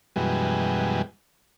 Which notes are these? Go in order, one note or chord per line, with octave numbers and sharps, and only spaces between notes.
F#2 B2 E3 G3 G#3